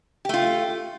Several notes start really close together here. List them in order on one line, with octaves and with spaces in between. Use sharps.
G4 A3 F4